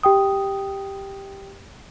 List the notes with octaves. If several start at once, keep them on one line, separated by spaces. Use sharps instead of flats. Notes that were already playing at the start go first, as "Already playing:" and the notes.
G4 G5 D#6